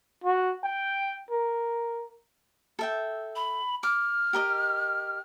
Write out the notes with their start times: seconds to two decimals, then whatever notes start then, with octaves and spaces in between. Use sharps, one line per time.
0.24 F#4
0.64 G5
1.31 A#4
2.79 A4 E5 G5
3.36 B5
3.83 D6 F6
4.33 G4 A#4 D#5